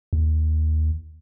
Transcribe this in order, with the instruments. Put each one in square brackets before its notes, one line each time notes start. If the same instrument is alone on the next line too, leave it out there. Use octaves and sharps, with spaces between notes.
[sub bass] D#2